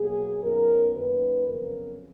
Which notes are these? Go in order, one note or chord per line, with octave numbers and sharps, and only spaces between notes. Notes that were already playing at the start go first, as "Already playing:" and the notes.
Already playing: B2 F#3 A#3 G#4
F#2 D#3 F#3 B3 A#4
F#2 D#3 A#3 B4
F2 C#3 F#3 B3 A#4